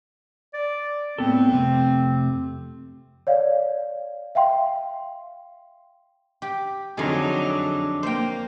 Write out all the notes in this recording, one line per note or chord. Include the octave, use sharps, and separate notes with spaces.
D5
A2 B3 C4 A4
F2 C3 A3
C#5 D5 F5
E5 F5 G5 C6
G4
F2 D3 F#3 D4 D#4 G#4
A#3 C5 G5